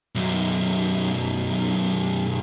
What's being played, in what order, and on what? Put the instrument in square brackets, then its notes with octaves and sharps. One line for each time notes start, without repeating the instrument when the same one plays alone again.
[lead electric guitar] B1 F#2